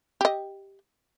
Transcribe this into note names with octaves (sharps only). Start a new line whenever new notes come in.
G4 D#5